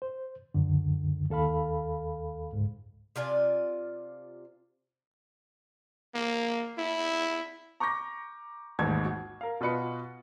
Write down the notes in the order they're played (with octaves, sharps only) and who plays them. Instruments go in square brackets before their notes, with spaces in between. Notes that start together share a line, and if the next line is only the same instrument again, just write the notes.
[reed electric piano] C5
C#2 F#2 D3
D#2 A4 F5 B5
C#2 G#2
[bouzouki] C3 F4 D5 G#5
[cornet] A#3
E4
[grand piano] A#5 C#6 D6 G6 A#6
A1 D#2 G#2 G#6
F#4
A#4 F5
B2 F4 F#4 B4 D#5 C#7